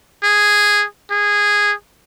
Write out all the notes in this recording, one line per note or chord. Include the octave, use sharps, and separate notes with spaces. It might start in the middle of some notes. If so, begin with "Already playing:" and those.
G#4
G#4